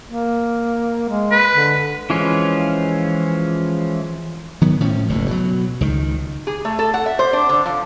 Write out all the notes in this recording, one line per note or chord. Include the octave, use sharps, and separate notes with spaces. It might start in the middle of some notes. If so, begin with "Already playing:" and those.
A#3
G#3
B4
D3
E3 F3 G#3 C#4 F4
D#3 F#3 B3
A2 F3 C#4
F#1 D2 A2
B2 F#3
C#2 D#3
G#4
A3
A4
F#5
E5
C5
D4
D3
F3